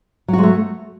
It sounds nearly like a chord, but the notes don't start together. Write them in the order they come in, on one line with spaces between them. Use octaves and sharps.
F#3 F#4 G#3 A3